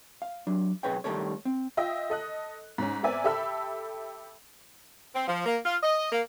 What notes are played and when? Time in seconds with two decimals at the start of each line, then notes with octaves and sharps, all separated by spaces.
0.22 F5
0.47 F#3 D4
0.83 B1 F#3 G#4 B4 C#5 G5
1.04 D#3 G3 A3 A4 A#4 C#5
1.45 C4
1.77 F4 D#5 E5 G5
2.10 A4 D#5 F#6
2.78 G#2 C#4
3.03 B3 C4 A#4 D5 E5 G#5
3.24 G4 A4 E5 B5 E6
5.15 C4
5.28 F3
5.46 A#3
5.64 F4
5.83 D#5
6.11 A#3